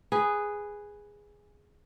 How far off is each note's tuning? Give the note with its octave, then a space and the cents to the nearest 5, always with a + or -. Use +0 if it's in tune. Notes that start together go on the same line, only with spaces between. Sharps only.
G#4 -5 B4 +5